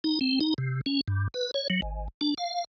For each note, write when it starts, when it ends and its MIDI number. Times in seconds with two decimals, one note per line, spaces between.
0.04 0.19 63
0.21 0.39 60
0.41 0.54 63
0.58 0.81 48
0.86 1.01 61
1.08 1.28 43
1.34 1.51 71
1.54 1.68 73
1.70 1.81 54
1.82 2.08 32
2.21 2.34 62
2.38 2.64 77